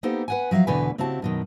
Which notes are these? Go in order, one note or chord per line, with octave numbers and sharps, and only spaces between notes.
A#3 B3 D#4 G4 A4 C5
B4 F#5 G#5
F3 F#3 B4 E5 F5
E2 B2 D3 A3 B4 G#5
C#3 C4 E4 F#4 G4 A5
F#2 B2 D#3